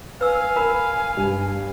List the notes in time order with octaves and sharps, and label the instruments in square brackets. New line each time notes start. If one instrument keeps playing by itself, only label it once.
[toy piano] B4 E6 [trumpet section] F5 [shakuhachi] G#5
[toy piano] A#4 [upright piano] B5
[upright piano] G2